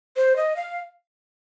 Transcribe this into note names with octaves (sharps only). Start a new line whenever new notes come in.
C5
D#5
F5